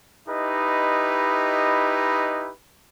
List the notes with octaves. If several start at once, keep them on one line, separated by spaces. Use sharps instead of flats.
D#4 E4 G4 B4 D#5